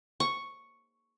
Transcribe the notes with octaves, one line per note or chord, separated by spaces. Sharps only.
C#6